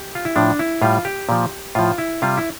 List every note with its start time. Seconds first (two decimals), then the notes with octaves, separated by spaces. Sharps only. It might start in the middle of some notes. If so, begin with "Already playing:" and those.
Already playing: G4
0.15 F4
0.25 E4
0.36 A2 F3 D4
0.59 E4
0.82 A2 G3 F4
1.05 G4
1.29 A#2 F3
1.75 A2 F3 F4
1.98 E4
2.22 C3 G3 F4
2.37 E4